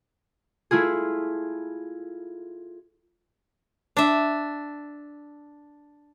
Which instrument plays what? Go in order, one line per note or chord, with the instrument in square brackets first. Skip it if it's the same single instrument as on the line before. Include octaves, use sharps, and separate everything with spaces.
[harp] A3 E4 F4 G#4
[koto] D4 E5